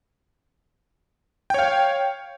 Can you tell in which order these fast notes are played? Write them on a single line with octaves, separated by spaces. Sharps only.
G5 C#5 F5